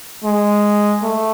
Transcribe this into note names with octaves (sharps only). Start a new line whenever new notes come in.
G#3
A3